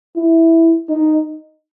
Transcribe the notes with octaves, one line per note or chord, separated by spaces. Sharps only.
E4
D#4